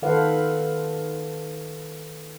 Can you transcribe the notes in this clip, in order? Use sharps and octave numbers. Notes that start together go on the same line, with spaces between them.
D#3 A4 B4 C5 F5 F#5